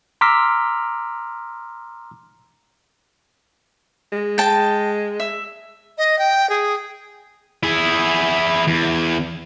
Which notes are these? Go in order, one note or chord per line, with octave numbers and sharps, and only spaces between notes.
A#5 C6 D6 E6 F6 B6
G#3
G5 A5
E5
D#5
G5
G#4
E4 G#4
E2